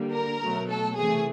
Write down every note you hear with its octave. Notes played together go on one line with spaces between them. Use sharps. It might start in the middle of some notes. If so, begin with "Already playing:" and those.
Already playing: D3 G3 A#3
A#4
B2 F#3 A3
A4
C3 E3 A3 G#4